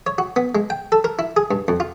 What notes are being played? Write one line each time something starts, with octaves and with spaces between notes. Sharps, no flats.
C#5
F#4
B3
G#3
G5
A4
A#4
E4
G#4
G2
F2
F4